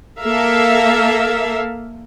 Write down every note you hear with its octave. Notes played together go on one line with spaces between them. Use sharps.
A#3 A4 A#4 E5 F5